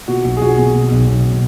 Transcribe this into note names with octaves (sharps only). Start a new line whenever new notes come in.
B2 F#4
B1
G#4
B1 F#4
B2
B2
B1
B1
B2